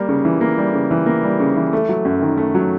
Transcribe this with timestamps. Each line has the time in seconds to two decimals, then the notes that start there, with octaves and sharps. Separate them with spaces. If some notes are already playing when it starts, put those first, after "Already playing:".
Already playing: G3 A#3
0.09 C#3
0.25 E3
0.41 A#3
0.58 G3
0.74 C#3
0.91 E3
1.06 A#3
1.23 G3
1.40 C#3
1.56 E3
1.73 A3
1.89 F#3
2.05 F#2
2.22 D#3
2.37 A3
2.55 F#3